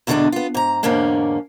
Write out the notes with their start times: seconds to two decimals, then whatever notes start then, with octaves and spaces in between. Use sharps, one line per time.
0.07 E2 B2 D3 G3 G#3 D4
0.32 B3 F4
0.54 G#2 A#5
0.83 E2 G#2 D3 A#3 C#4 D4